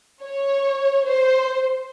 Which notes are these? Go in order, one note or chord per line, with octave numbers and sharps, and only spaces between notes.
C#5
C5